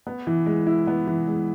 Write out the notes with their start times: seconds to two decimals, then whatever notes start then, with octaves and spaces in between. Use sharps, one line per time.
0.07 B3
0.27 E3
0.46 G#3
0.67 E4
0.87 B3
1.07 E3
1.28 G#3